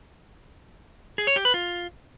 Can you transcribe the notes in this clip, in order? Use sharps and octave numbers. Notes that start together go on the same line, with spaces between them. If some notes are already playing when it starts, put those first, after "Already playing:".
G#4
C#5
G4
B4
F4